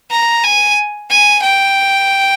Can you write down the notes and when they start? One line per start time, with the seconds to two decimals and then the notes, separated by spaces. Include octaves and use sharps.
0.10 A#5
0.43 G#5
1.10 G#5
1.42 G5